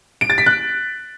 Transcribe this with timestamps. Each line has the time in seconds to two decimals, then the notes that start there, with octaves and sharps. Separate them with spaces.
0.21 D7
0.30 A6
0.38 B6
0.46 F#6